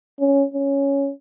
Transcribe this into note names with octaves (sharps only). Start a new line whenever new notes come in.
C#4
C#4